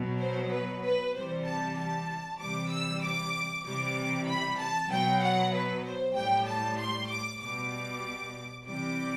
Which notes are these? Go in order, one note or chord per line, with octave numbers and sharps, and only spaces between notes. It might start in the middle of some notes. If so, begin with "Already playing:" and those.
Already playing: B2 F#3
C5
B4
B4
C3 E3 G3 C5
A5
A5
C3 E3 G3 D6
E6
D6
C3 E3 G3 D6
B5
A5
B2 F#3 G5
F#5
B4
C5
A2 G3 G5
A5
C6
D6
B2 G3 D6
C3 E3 G3 D6